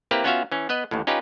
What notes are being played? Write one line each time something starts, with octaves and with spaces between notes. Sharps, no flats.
A#3 C4 E4 G4 A#4 B4
B3 C#4 F4 F#4 E5 F5
E3 C#4
B3 B4 D#5
A1 D#2 A2
C#4 D#4 F4 G4 B4